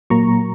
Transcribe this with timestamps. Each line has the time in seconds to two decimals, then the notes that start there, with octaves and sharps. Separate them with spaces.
0.10 A#2 F#3 A#3 A#5 C#6